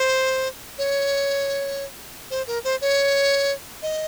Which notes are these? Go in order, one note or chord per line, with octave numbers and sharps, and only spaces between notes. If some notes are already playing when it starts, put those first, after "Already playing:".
Already playing: C5
C#5
C5
A#4
C5
C#5
D#5